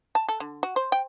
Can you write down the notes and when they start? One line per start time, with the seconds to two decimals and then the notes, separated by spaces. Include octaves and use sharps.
0.15 A5
0.28 A4
0.40 D3
0.63 F#4
0.76 C5
0.92 G5